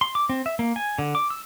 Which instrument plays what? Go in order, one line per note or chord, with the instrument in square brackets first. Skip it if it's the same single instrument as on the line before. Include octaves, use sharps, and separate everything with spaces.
[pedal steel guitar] C6
D6
C4
E5
A#3
G#5
D3
D6
E6